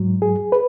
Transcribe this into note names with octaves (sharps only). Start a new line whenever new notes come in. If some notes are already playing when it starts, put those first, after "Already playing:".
Already playing: G#2 F#3
G#4
B4